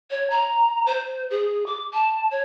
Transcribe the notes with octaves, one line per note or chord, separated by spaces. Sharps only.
C#5
A#5
C5
G#4
D6
A5
C#5